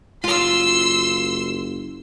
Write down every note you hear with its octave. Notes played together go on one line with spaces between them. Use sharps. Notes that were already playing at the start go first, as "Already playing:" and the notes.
F#1 F4 F5 C6 E6